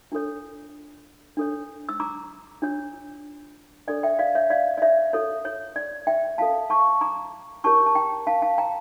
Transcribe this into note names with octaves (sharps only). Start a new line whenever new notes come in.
D4 F4 A4 C#5
D4 A4 C#5
E6
A#5 D6
D4 F4 C#5
D4 A4 C#5 D5
E5 G5
D5 F5
C#5 E5
D5 F5
D5
C#5 E5
F4 A4 C#5
C#5
D5
E5 G5
C#4 F4 A4 F5 A5
A5 C#6
A#5 D6
E4 G4 A#4 C#5 A5 C#6
A5
G5 A#5
F5 A5
F5 A5
G5 A#5